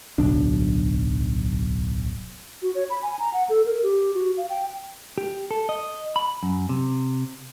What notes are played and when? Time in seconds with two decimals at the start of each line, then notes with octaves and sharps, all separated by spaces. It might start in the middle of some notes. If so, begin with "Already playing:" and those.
0.18 D1 B1 D4
2.62 F#4
2.75 C#5
2.90 B5
3.03 G#5
3.19 A#5
3.33 F#5
3.49 A4
3.66 A#4
3.83 G4
4.14 F#4
4.37 F5
4.50 G5
5.18 G4
5.51 A4
5.69 D#5
6.16 B5
6.43 F#2
6.69 C3